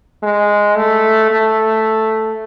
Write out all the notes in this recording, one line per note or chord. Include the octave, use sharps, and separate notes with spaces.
G#3
A3
A3